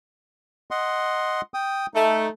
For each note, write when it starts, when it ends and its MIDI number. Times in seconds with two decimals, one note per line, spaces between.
0.71 1.41 75
0.71 1.41 78
0.71 1.41 84
1.54 1.86 79
1.54 1.86 87
1.94 2.25 57
1.94 2.29 63